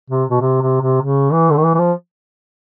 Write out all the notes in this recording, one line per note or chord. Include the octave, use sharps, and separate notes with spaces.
C3
B2
C3
C3
C3
C#3
E3
D3
D#3
E3
E3
F3